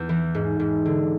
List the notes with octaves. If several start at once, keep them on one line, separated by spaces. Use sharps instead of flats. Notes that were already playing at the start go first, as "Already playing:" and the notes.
Already playing: E2 B3
E3
G#2
G#2
D3